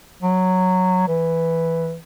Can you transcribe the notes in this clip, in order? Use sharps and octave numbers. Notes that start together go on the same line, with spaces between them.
F#3
E3